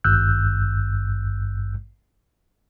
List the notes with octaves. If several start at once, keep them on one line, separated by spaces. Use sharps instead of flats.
G#1 G2 E6 F#6 G6